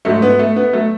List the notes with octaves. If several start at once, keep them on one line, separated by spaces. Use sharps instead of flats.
G#2 F#3 A3
B3
A3
B3
F#3 A3